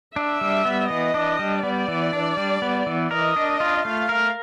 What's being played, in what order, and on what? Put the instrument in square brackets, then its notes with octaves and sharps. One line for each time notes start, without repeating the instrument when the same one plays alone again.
[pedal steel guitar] D4 [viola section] E5
[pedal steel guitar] G3
B3
[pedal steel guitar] E3 [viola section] D#5
[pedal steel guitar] D4
G3
[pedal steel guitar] B3 [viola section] D5
[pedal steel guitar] E3
D4
G3
B3
E3
[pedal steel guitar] A#4 [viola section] D#5
[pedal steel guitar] D4
F4
[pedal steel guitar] A3 [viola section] F5
[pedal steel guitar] A#4